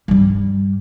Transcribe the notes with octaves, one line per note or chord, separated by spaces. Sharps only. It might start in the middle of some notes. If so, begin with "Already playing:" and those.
G2 G3